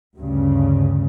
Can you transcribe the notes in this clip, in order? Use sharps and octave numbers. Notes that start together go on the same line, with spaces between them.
D2 G2 C#3